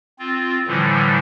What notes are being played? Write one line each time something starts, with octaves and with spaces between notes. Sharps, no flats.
C4 F4
A2 D3 E3 F3 G3